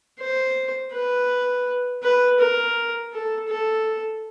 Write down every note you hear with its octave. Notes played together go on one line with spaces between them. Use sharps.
C5
B4
B4
A#4
A4
A4